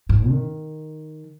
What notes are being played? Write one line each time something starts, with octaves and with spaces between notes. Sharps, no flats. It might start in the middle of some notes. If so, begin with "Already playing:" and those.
G#2
D#3